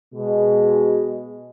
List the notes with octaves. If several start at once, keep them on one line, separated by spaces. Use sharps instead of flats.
B2 G#3